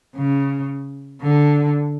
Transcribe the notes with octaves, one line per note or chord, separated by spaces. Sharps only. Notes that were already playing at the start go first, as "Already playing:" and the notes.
C#3
D3